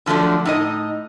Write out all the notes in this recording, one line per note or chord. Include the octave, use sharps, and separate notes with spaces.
D3 F3 F#3 A3 D4
A2 D#4 D#5